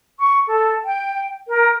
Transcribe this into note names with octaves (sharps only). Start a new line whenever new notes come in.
C#6
A4
G5
A#4